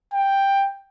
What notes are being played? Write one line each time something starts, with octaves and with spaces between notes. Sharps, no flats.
G5